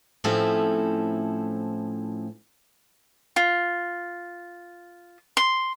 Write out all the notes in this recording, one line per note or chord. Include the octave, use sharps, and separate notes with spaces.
A2 F3 C4 C#4 E4 A4
F4
C6